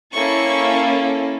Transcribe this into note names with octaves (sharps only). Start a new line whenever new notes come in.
A#3 C#4 E4 A4 C#6